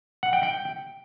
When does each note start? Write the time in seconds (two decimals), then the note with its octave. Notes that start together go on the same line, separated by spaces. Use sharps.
0.23 F#5
0.33 G5
0.43 G5